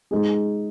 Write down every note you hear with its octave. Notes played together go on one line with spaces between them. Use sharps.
G#3 D#4 G#4